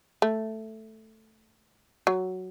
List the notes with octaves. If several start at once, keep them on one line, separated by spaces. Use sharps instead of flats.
A3
F#3